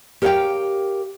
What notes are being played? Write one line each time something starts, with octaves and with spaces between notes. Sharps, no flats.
G4 A#4 C#5 D#5 F5 G5